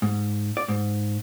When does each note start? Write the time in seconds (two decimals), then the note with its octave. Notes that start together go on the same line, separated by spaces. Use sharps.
0.02 G#2
0.57 D5
0.68 G#2